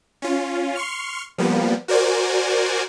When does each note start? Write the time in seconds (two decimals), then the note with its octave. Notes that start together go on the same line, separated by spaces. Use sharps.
0.22 C#4 F4
0.76 C6 C#6 F6
1.38 F3 G3 A#3 B3
1.88 F#4 A#4 C5 D5 G#5